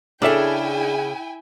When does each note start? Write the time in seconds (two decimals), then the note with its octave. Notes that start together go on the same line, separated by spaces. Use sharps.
0.22 C#3 D4 E4 G#4 A4 E5 G5 G#5